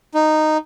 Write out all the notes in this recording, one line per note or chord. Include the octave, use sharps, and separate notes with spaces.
D#4